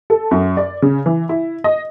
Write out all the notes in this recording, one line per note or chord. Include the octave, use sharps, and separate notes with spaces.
A4
F#2
D5
C#3
E3
E4
D#5